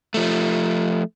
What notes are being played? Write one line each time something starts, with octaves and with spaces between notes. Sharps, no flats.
F3 A3